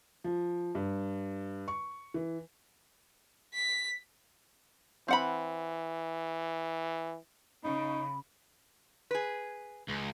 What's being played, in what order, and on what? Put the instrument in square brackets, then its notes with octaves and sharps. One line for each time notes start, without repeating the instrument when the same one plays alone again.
[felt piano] F3
G2
C#6
E3
[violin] B6
[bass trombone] E3 [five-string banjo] C4 F#5 B5
[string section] C#3 [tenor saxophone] D#4 [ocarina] B5
[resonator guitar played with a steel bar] G#4 B4
[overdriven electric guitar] C#2